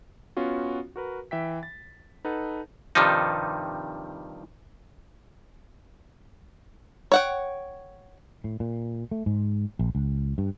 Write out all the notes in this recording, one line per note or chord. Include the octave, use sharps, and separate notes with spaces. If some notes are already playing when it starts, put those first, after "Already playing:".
B3 C#4 F4 F#4
F#4 A#4 B4
E3 E5 G5 B6
A6
D#4 A4 B4 F#5 A5
G2 C3 D#3 F3 G3 D#4
C#5 F#5 G5
A2
A#2
A3
G#2
A#1
C#2
G2